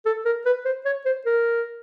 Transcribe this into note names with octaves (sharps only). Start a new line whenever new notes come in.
A4
A#4
B4
C5
C#5
C5
A#4